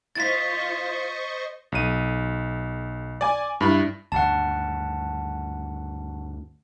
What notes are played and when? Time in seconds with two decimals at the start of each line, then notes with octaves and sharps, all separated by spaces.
0.15 F4 C5 D#5 C#6 A6 B6
1.72 B1 D#7
3.21 D5 G#5
3.61 G2 E4 B5
4.12 D2 G2 C#3 F#5 A5